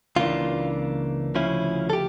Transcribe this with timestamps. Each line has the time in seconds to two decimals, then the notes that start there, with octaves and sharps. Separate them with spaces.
0.16 C#2 C#3 E3 A#3 D4 F4
1.35 D2 C#3 F3 C#4 E4
1.90 A4
1.93 G4